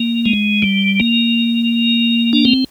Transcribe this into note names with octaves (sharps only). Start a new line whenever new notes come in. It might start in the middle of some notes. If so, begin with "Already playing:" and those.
Already playing: A#3
G#3
G3
A#3
D4
C4